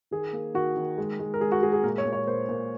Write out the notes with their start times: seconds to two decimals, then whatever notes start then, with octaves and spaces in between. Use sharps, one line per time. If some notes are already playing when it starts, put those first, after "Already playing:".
0.11 D#3 G#4
0.33 A#3
0.54 D#3 F#4
0.76 D#3
0.98 G#3
1.19 G#3
1.34 A#4
1.40 G#3 G#4
1.52 F#4
1.62 G#3 G#4
1.73 G#4
1.84 A#2 A#4
1.98 C#5
2.05 A#2
2.13 C#5
2.27 A#2 C5
2.49 A#2